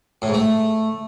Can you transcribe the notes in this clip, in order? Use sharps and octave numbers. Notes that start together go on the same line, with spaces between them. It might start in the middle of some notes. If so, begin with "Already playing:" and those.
A2
G#2
A3